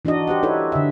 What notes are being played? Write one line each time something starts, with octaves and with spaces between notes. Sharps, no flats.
E3 D4 D#4 F#4 D#5
G4 C5 F#5
D#4 E4 A4 B4 C#5
D3 E5